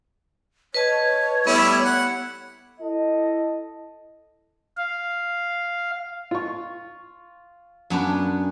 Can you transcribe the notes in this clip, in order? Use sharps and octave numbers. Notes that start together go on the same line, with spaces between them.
B4 C#5 D#5 A5
G3 A3 B3 E4
F#5
E4 A4 D#5
F5
F4 C#6
F#2 B3 D4